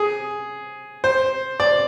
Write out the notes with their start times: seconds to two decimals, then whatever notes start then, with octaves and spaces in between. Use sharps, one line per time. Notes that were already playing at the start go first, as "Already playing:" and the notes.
Already playing: G#4
1.04 C5
1.60 D5